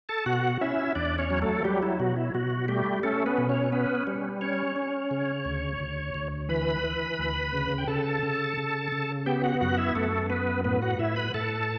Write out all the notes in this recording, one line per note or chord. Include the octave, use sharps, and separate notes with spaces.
A4 A5
B2 F#4 F#5
C#4 E4 E5
E2 D4 D5
C#4 C#5
F#3
A3 A4
F#3 G3 G4
E4
B2 F#4
E4
B2 F#4
G3 A3 G4
A3 C#4 A4
B3 B4
B2
C#4 C#5
B3 C#4 B4
G3
C#4 C#5
C#4
C#3
D2
D2
D2
E3 B4 B5
E3
D2
C#3
G5
C#3 A4 A5
C#3
C#3
C#3
B3 G4 G5
F#4 F#5
F#2 F#4 F#5
E4 E5
F#2 A3 A4
B3 B4
A2 B3 B4
F#4 F#5
A2 E4 E5
B4 B5
A2 A4 A5